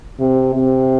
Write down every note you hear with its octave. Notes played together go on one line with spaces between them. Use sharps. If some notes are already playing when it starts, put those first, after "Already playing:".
C3
C3